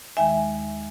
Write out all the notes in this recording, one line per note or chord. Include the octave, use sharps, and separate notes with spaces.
D#2 D#3 G#3 E5 G#5